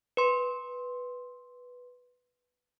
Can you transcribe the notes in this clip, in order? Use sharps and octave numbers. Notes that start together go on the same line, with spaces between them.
B4 C6